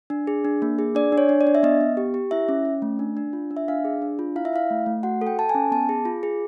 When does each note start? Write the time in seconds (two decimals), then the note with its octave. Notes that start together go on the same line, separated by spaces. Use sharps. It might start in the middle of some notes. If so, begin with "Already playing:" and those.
0.10 D4
0.27 G#4
0.45 D4
0.62 A#3
0.79 G#4
0.95 D4 D5
1.12 D4
1.18 C#5
1.29 D4
1.41 D5
1.47 D4
1.55 E5
1.63 B3 D#5
1.81 B3
1.97 G4
2.14 G4
2.31 E4 E5
2.49 C#4
2.65 C#4
2.82 A3
2.99 D4
3.17 D4
3.33 F4
3.51 D4
3.57 E5
3.68 D4 F5
3.85 G#4
4.02 D4
4.19 F4
4.36 E4 F5
4.45 E5
4.53 E4 F5
4.70 A3
4.86 A3
5.03 F#4 F#5
5.21 A4
5.27 G5
5.37 A4 A5
5.49 G#5
5.55 C#4
5.72 B3 A5
5.89 G#4
6.05 F4
6.23 G#4